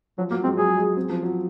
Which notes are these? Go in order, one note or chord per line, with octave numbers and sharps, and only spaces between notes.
F3 F#3
F#3 A#3
G#3 C4
F#3 G#4
G#3
C4
F3
F#3